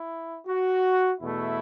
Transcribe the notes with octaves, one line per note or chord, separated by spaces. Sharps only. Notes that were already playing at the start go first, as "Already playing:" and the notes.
Already playing: E4
F#4
E2 B2 A3 E4